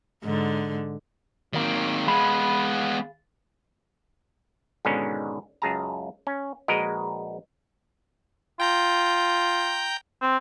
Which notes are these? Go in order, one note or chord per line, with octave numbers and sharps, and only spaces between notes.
G#2 D3
D#3 F#3 A#3 C4
G#3 B3 G#4 F5 B5
G#2 B2 D3 D#3 G#3 C#4
C#2 F#2 G#4 A5 A#5
C#4
A#1 G#3 F#4 A#4 B4 D#5
F4 G5 A#5 G6
C4